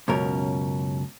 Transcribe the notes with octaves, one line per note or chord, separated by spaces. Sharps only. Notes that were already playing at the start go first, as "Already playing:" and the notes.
C#2 F#2 B2 C#4 A#4